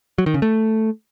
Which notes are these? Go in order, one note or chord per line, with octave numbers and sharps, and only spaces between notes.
F#3
D#3
C#3
A3